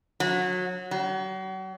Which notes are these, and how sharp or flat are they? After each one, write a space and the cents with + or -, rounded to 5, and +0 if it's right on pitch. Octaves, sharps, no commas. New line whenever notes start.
F#3 -25
F#3 +40